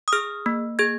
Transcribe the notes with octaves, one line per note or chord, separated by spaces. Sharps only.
D#6
G#4 F6
A#3
G#4 G#6